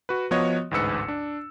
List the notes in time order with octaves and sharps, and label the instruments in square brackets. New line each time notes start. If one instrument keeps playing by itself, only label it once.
[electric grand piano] F#4 B4
F3 B3 F#4 C#5 D#5
A1 D2 G#2 B4 E6 C#7
D4